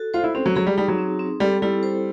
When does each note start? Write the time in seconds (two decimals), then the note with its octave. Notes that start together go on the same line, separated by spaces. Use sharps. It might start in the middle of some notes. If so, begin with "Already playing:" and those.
Already playing: F#4 A4
0.14 F4 C5
0.24 E4
0.35 C4 C#4
0.46 F#3
0.56 F#3 G#4
0.67 G3
0.77 G3 D#4
0.88 F#3
0.98 C4
1.20 C4
1.40 G3 A4
1.62 G3 E4
1.83 C5